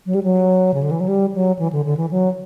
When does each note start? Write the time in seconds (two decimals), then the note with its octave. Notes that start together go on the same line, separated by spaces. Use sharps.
0.06 F#3
0.15 G3
0.23 F#3
0.74 C#3
0.83 D3
0.91 E3
1.00 F#3
1.08 G3
1.34 F#3
1.59 E3
1.73 D3
1.85 D3
1.97 E3
2.11 F#3